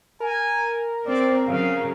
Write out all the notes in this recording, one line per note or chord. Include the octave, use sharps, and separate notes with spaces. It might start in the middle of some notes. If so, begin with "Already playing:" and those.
A#4 G#5
C4 D5
C#3 F#3 F5